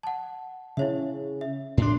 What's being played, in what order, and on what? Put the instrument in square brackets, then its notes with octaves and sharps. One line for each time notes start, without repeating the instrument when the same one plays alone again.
[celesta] F#5 A5
[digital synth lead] C#3 [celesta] E4 C#5 E5
[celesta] E5
[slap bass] A2 D4 [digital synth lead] C6